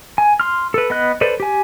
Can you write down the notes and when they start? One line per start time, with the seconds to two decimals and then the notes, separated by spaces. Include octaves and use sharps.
0.18 G#5
0.40 C6 F6
0.74 A4 B4
0.90 B3 D#5 F#6
1.21 A4 B4 C5 D5
1.40 G4 G#5